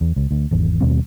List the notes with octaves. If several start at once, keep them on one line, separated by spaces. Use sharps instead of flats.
E2
C#2
D2
G#1 E2
D#2 B2 G3 C4